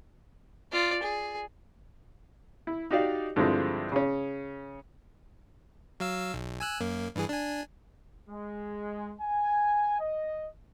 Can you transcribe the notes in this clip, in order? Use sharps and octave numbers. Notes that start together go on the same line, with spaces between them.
F4 D5
G#4
E4
D#4 F#4 G4 D5 F5
G2 D3 F3 G#3 C4 E4
C#3 C#4
F#3 F5 E6
B1
G#5 E6 F#6
F#2 A#3
G2 E3 G#4
D4 G#5
G#3
G#5
D#5